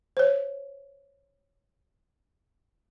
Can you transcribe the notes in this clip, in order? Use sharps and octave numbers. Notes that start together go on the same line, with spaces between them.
C5 C#5